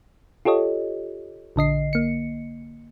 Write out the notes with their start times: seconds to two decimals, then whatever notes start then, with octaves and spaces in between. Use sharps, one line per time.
0.45 F4 G4 A4 C#5 D#5
1.56 A#1 D3 D#5 C7
1.93 A#3 C#7